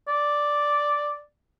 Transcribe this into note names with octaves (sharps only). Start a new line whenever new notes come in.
D5